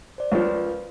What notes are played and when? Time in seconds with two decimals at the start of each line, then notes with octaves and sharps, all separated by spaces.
0.18 C5 D5
0.32 C#2 F3 A#4 B4